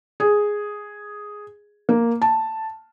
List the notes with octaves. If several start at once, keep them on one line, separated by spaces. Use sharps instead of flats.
G#4
A#3
A5